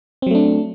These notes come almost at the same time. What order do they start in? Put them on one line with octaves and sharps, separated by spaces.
C4 F#3 A3 D4